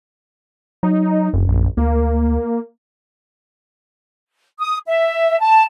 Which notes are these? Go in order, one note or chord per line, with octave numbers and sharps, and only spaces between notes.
F#3 D#4
F1 F#2
A#1
D2 A#3
D#6
E5
A5